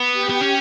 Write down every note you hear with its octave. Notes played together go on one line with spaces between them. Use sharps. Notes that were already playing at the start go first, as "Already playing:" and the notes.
Already playing: B3
G4 G5
B3
C#4